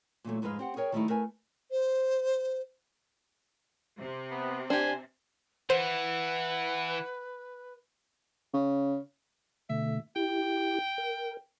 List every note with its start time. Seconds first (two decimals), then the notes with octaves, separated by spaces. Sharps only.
0.24 A#2 E3 F#3 A3
0.42 F2 G#2 G#3 B4 F5
0.59 C4 G4 F#5
0.76 G#4 A#4 C#5 G5
0.92 D#3 G3 A3 C4 D#4 E4
1.08 A3 A#4 B4 F5 G#5
1.71 C5
3.99 C3
4.31 B3
4.70 D4 G4 C5 G#5
5.70 E3 B4 C5 F#5
8.54 C#3
9.70 B2 D3 A3 E5
10.16 E4 G4 G5
10.98 A#4